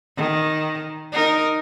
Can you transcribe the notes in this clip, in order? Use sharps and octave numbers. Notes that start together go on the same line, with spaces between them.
D#3
D#4 A#4